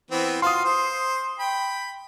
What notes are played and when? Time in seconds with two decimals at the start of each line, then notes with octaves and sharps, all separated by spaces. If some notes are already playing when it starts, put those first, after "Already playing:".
0.11 E3 B3 C4
0.42 F4 F#4 F5 C6 D#6
0.65 C5
1.39 G5 B5